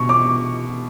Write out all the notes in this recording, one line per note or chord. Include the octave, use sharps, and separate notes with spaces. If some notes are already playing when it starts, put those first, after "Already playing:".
Already playing: B2 C#6
D6